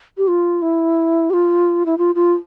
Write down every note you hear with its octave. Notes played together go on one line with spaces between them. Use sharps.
G4
F4
E4
G4
F4
E4
F4
F4